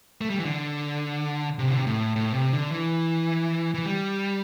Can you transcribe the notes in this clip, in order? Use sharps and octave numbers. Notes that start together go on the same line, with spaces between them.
A3
G3
E3
D3
C3
D3
C3
A2
A2
C3
D3
E3
E3
G3